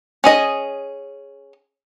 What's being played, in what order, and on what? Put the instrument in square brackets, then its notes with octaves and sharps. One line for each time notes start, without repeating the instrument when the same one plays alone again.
[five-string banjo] C#4 G#4 D#5